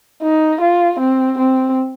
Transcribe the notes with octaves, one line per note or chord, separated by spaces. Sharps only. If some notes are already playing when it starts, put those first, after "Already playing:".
D#4
F4
C4
C4